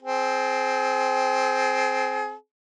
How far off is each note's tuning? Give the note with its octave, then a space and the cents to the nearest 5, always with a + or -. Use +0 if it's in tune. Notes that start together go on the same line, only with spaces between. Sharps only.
C4 +0 G#4 +35